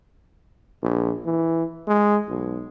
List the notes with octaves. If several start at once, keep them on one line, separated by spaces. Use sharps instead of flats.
A#1
E3
G#3
B1